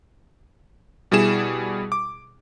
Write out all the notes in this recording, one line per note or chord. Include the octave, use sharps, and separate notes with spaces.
B2 G3 E4 G#4 E7
D6